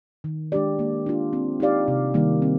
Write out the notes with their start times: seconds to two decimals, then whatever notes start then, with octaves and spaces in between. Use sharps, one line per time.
0.24 D#3
0.52 G#3 D4 G4 D5
0.79 A#3
1.06 D4 F4
1.33 C4
1.60 D#4 G4 D5 F5
1.88 C3
2.14 D#3 G3 A#3
2.42 C4